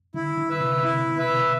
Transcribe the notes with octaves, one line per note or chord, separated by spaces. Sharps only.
D3 E4
D3
B4 E5
C3
C3 E4
B2
B4 E5